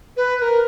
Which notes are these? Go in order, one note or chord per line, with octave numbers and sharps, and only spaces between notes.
B4
B4
A#4